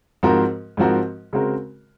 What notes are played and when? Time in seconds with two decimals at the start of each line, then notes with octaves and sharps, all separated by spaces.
0.23 G#2 F3 C4 F#4 A#4
0.77 G#2 F3 C4 F#4 A#4
1.33 C#3 G#3 C4 F#4 A#4